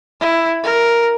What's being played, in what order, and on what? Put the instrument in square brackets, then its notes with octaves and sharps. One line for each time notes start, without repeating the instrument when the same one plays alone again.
[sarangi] E4
A#4